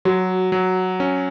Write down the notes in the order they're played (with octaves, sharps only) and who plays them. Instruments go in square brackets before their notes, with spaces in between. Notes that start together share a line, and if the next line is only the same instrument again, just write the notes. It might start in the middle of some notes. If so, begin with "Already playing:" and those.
[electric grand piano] F#3 [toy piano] F#4
[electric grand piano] F#3
C#4